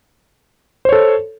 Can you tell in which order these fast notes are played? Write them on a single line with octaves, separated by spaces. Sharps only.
C5 C#5 A4